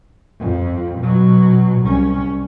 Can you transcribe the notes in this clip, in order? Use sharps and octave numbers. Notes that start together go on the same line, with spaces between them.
F2
B2 F#3
C2 C#4